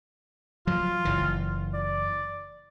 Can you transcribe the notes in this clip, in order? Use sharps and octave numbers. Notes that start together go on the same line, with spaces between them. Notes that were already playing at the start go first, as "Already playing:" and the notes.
F3 F#3 F4
F#1 E3
D5